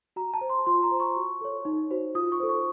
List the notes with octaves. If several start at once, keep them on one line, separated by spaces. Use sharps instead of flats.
F#4 A#5
A5
C5
C6
F4 C6
A#5
C5
C#6
F#4
A4 C#5
D#4
F#4 C5
F4 D#6
C#6
A4 C5
C#6